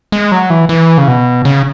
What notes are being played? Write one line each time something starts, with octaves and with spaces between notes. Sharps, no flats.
G#3
F#3
E3
E3
C#3
B2
C#3